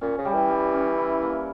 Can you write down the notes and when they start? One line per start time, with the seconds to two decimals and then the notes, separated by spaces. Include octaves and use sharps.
0.01 A#2 C#4
0.18 C#3
0.25 G3
0.34 E3
0.50 G3
0.73 C#4
0.98 E4
1.22 A#3